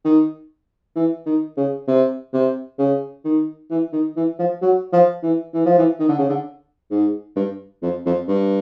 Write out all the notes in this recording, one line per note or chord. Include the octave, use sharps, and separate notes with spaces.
D#3
E3
D#3
C#3
C3
C3
C#3
D#3
E3
D#3
E3
F3
F#3
F3
E3
E3
F3
E3
D#3
D3
C#3
D3
G#2
G2
F2
F2
G2